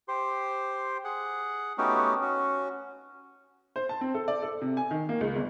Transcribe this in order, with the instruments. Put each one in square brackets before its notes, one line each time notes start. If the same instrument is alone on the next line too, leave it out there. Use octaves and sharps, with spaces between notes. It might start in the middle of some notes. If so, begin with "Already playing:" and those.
[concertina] G4 C5 C6
G#4 F#5
A3 B3 C#4 D#4 F#4 G4
C#4 F#4
[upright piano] C5
A5
C4
A4
D5
A4
C3
G#5
D#3
A#3
C#2
G1